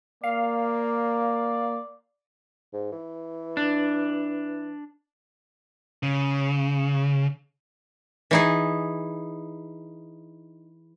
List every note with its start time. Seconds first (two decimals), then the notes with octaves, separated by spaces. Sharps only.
0.24 A#3 D5 F5
2.73 G#2
2.92 E3
3.57 D4
6.03 C#3
8.31 E3 D#4 G#4